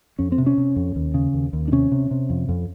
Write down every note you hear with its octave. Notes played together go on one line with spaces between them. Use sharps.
F2 C#4
C4
C3
C#4
C3
F2
D#2
C#3
D#2
D#2
D4
C3 C#4
C3
C3
F2
F2